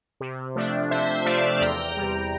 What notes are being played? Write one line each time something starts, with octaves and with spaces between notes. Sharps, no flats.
C3
F3 A3 D4
C3 C5 E5
F3 A3 D4 D5 F5
E2 G5 A#5
C3 G3